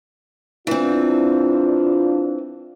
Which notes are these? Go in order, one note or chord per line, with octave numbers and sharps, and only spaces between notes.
E3 C4 D4 F4